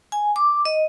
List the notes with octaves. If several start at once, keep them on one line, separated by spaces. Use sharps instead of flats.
G#5
D6
D#5